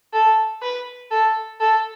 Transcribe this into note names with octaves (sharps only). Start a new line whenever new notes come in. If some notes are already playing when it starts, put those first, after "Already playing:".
A4
B4
A4
A4